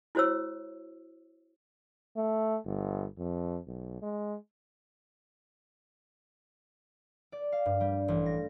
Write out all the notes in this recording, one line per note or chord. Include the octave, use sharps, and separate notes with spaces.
E4 F#4 C5 C#5 E6
A3
G1
F2
B1
G#3
D5
F5
G2
G3
A1
A#6